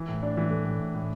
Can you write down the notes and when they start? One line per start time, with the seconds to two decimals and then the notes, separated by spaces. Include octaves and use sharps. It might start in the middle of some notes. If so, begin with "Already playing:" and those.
Already playing: E3
0.08 A2
0.23 D4
0.37 E3
0.51 A3
0.65 A2
0.79 A2
0.95 A2